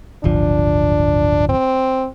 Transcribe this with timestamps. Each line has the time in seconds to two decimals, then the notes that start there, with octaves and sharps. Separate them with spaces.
0.24 D1 G1 F3 D4
1.49 C4